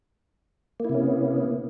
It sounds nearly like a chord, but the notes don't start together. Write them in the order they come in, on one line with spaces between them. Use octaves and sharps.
A#3 E4 C3 C#4 B3